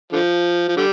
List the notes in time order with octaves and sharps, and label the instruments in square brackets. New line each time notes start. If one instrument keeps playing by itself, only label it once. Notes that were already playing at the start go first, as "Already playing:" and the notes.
[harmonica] D3 F3
F3
D3 G3